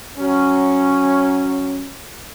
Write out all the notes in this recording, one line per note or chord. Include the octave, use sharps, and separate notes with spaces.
F#3 C#4